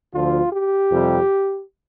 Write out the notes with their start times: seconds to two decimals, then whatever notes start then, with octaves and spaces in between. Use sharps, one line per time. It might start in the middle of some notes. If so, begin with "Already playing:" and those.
0.14 D2 D3 F3 F4
0.52 G4
0.90 F2 C3 G3